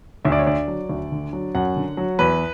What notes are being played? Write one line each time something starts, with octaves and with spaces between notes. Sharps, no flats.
D2 E5
D5
C#5
D3 D5
F#3
D2
D3
F#3
F#2 F#5
D3
F#3
E2 B4